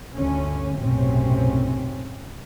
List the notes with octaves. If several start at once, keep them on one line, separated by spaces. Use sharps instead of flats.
G1 D2 D3 C#4
B1 F#2 A2 C3 C4 C#4